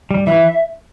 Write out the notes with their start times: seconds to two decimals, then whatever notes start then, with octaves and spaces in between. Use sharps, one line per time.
0.11 G3
0.26 E3 E5